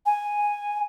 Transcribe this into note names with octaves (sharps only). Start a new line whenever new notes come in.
G#5